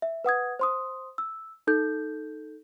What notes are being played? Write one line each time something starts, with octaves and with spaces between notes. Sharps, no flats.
E5
B4 F#5 D#6 G#6
C5 C6 D#6
E6
D#4 A4 G6